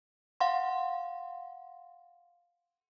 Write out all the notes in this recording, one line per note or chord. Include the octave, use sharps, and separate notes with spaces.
F5 F#5 C6